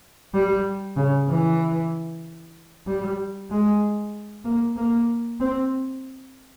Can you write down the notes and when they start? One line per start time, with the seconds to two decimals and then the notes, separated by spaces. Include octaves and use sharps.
0.34 G3
0.96 C#3
1.28 E3
2.87 G3
3.50 G#3
4.45 A#3
4.76 A#3
5.40 C4